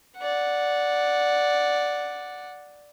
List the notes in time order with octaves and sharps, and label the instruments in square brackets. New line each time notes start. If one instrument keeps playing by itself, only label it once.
[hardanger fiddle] D5 F#5